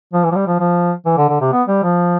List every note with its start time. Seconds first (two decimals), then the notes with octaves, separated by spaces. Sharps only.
0.13 F3
0.24 E3
0.31 F3
0.36 G3
0.47 F3
0.60 F3
1.05 E3
1.18 D3
1.29 D3
1.41 C3
1.52 B3
1.68 G3
1.83 F3